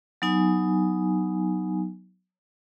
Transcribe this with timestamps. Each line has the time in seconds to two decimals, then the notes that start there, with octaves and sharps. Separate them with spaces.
0.22 F#3 B3 D#4 G#5